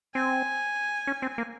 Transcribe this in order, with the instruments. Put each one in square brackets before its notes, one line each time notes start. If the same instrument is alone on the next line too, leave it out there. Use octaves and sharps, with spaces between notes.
[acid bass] C4 [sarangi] G#5
[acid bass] C#4
C4
A#3